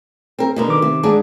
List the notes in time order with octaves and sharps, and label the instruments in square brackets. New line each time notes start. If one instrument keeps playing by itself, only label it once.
[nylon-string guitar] C4 A#4
B2 D3 A#4
[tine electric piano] D#3 D6
[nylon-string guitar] C3
G#2 D4 G#4